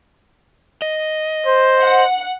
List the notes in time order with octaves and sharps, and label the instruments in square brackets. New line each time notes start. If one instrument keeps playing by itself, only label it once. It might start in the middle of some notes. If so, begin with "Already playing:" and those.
[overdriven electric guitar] D#5
[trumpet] C5
[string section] F#5